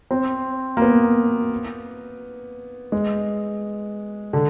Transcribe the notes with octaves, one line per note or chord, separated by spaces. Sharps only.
C4
A#3
B3
G#3
D3